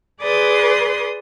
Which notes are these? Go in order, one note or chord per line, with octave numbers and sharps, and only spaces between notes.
G#4 B4 D5 C6 D#6